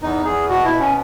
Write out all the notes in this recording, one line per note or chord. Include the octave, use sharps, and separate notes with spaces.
E2 D#4
E2 G#4
B2 F#4
E4
B2
C#4